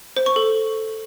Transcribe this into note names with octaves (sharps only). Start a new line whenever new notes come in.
C5
C#6
A4